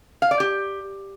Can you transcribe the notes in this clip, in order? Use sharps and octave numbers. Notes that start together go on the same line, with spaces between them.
F5
D5
G4